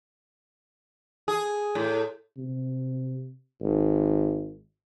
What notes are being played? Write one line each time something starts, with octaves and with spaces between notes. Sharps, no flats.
G#4
A2
C3
G#1